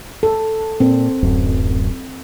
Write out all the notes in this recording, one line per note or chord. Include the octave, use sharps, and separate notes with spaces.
A4
A#2 C4
D1 F#2